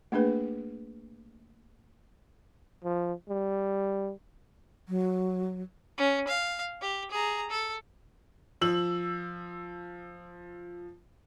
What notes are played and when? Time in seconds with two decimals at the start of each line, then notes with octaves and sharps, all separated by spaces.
0.12 A3 A#3 D4 G#4 B4
2.84 F3
3.29 G3
4.89 F#3
5.98 C#4
6.28 F5
6.82 G4
7.11 G#4 A#5
7.51 A4
8.61 F3 E6 F#7